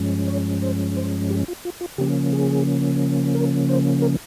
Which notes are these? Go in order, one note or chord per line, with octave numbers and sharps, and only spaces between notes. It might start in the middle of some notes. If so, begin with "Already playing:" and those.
Already playing: G2 F3 G#3 C#4
C#5
C5
C5
G4
F4
F4
F4
C#3 F3 A#3 C#4 G4
G#4
A#4
C5
A#4